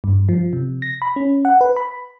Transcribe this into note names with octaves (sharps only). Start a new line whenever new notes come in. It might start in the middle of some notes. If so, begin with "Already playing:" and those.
G2
F3
C3
A#6
B5
C#4
F#5
B4
B5